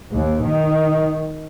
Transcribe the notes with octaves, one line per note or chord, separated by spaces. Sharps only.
D#2
D#3